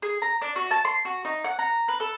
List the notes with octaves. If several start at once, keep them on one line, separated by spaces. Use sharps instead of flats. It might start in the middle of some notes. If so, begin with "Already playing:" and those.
G#4
A#5
D4
F#4
A5
C6
F#4
D#4
F#5
A#5
B4
A4